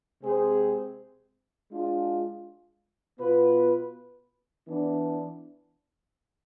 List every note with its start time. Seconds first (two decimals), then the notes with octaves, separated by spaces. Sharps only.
0.22 C3 G#3 C4 G#4 C5
1.70 G#3 D4 F4 G#4
3.19 B2 B3 F4 B4
4.67 E3 B3 D4